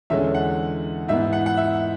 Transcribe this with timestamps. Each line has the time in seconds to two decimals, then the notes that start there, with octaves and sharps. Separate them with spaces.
0.10 E2 D3 G#3 C#4 E5
0.34 F#5
1.08 G#2 E3 B3 E5
1.33 F#5
1.46 F#5
1.57 E5